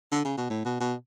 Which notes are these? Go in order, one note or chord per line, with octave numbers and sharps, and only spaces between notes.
D3
C#3
B2
A2
B2
B2